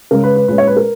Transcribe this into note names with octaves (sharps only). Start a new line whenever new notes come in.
C#3 G#3 C#4 A#4
B4
B4
A#2 G#3 C#4 B4
C#5
B4
A#4